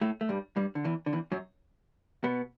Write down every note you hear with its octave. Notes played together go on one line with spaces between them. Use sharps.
A2 A3
A3
G2 G3
G2 G3
D3
E2 E3
D3
E2 E3
F#2 F#3
B2 B3